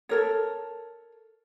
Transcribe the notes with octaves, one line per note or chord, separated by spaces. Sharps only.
A4 A#4 C#5